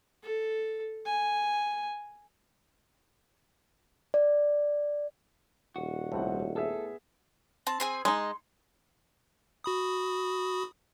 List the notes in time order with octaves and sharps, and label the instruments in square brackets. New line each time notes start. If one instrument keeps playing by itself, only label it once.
[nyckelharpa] A4
G#5
[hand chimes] D5
[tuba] D#1 [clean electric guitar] F#4
[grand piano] C2 C4 F#5 [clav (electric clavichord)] A2
[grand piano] B3 G#4 E5 [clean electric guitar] A4
[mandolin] C4 A5
C4 G#4 G#5
[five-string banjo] G#3 D#4 [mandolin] C6
[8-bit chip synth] F#4 B5 D#6